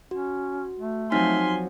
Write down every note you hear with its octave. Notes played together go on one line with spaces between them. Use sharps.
C#4 F#4
A3
F3 F#3 C4 D#4 G#5 C6 F6 B6